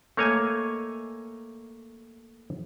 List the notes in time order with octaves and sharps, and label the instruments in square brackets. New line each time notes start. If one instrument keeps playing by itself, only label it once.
[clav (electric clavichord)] A3 A#3 C#5 D#5 G#5